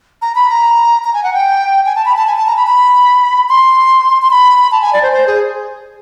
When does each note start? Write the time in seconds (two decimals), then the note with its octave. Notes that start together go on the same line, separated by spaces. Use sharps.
0.22 A#5
0.35 B5
0.49 A#5
1.04 A#5
1.14 G#5
1.24 F#5
1.34 G5
1.86 G#5
1.95 A5
2.05 B5
2.17 A5
2.27 G#5
2.37 A5
2.47 A#5
2.57 B5
2.67 B5
3.49 C6
4.22 C6
4.31 B5
4.72 A5
4.82 G#5
4.93 D5
5.03 C5
5.13 C5
5.27 G#4